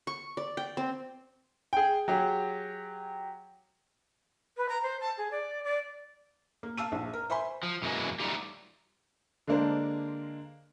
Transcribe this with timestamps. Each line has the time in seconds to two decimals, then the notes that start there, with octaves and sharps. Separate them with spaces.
0.07 C#6
0.37 D5
0.57 G5
0.77 C4
1.73 G#4 G5
2.08 F#3 G4 G#4
4.57 B4
4.69 A#5
4.83 C5
5.01 A5
5.18 G#4
5.31 D5
5.64 D5
6.63 A#3
6.78 F5 A5 E6 D#7
6.92 A#1
7.13 A#4
7.30 C5 E5 G#5 B5 C6
7.63 F3
7.82 F#2 B2 E3 G#3 A#3
8.20 F#3 G3 A3 D#4 F4 G4
9.47 D3 G#3 A#3 D4 A#4 C5